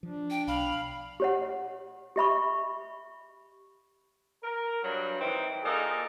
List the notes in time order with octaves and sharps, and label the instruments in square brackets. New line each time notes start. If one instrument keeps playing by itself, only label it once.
[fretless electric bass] F3 [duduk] D4
[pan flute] G5
[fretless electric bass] B1 [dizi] F5 [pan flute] B5
[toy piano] G4 C#5 F#5
G4 E5 B5 C#6
[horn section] A#4
G2 F#3
D#3 E3 C4 D#4
A#2 A#3 D#4 G#4 A4